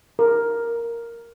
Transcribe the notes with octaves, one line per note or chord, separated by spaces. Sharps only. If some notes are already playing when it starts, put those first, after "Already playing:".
A#4